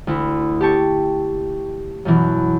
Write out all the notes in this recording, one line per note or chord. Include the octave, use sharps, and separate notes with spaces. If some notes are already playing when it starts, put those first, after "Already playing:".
D2 E4
G4 A5 C#6
F#2 B2 E3